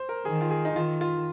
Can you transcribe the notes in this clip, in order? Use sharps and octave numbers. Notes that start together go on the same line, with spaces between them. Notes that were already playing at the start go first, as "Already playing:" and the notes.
Already playing: C5
A#4
D#3 G#4
F4
G#4
D#4
D#3 F4
F4